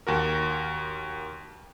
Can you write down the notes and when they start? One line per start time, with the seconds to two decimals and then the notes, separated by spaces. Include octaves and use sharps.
0.07 D#2 F#4 A#4